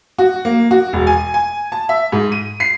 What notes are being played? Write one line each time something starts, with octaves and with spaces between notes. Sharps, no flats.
F#4
A#3
F#4
E1
G#5
G#5
A5
E5
G#2
D#7
C7